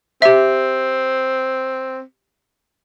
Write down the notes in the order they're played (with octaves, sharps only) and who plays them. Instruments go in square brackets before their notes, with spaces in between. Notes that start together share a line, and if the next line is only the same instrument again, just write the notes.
[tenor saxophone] C4 [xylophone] G4 E5